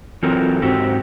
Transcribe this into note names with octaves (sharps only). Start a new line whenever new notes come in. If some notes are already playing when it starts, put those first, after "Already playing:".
E3 F#3 C4 F4 A4 A#4
G#2 C4 F#4 G4